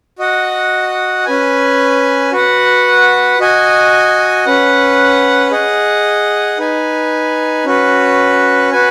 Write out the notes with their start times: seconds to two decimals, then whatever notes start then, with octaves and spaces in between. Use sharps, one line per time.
0.19 F#4 D#5 F#5
1.25 C#4 B4 G#5
2.32 F#4 B4 F#5
3.39 F#4 D#5 G#5
4.45 C#4 B4 F#5
5.51 G#4 D#5 F#5
6.59 D#4 B4 G#5
7.65 C#4 F#4 B4
8.72 F#4 B4 G#5